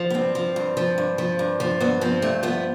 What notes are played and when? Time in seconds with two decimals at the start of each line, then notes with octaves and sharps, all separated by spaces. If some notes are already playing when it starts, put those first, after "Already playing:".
Already playing: F3
0.10 B3
0.14 G2 C4
0.35 F3
0.56 G2
0.77 F3
0.98 G2
1.18 F3
1.39 G2
1.60 F3
1.80 G2 B3
2.01 F3 C4
2.22 G2 A3
2.43 F3 B3